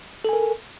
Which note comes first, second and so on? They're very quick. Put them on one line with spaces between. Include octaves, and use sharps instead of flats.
A4 G#5 A#4